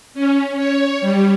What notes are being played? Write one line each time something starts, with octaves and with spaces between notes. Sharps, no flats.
C#4
C#5
G3